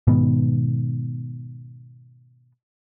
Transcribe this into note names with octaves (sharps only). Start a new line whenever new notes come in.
G#2 B2 D#3 B3